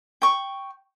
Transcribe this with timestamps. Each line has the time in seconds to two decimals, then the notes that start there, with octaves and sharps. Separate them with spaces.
0.22 G5 C#6